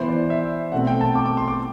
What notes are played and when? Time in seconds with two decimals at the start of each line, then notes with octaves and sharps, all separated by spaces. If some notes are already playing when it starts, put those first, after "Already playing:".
Already playing: E3 B3 C5
0.08 D5
0.30 E5
0.72 B2 A3 C4 F#5
0.87 G5
1.01 A5
1.15 D6
1.26 D6
1.37 C6
1.48 D6